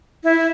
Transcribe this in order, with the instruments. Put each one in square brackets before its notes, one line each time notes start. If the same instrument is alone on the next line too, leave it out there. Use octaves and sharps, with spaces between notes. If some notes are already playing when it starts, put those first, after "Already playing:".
[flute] E4